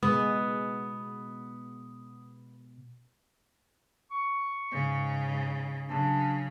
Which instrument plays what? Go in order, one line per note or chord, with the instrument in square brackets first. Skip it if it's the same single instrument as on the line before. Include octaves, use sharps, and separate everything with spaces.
[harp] B2 [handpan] G#3 [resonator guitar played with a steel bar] B3 [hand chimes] D#6
[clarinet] C#6
[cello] G#2 C#3
[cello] C#3 F#3 [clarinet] D4